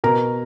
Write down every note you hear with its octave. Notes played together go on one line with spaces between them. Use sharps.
B2 A#4 A#5